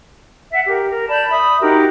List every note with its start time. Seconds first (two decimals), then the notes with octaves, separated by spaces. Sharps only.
0.52 E5 F#5
0.66 G4 A#4
0.90 A#4
1.08 D5 A5 B5 G6
1.29 E5 B5 D#6
1.61 D#4 F#4 G4 A#4